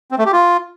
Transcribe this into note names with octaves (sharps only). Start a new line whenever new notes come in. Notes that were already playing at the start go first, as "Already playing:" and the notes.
C4
A3
G4
F4